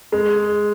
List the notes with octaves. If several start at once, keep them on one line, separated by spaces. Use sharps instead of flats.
G#3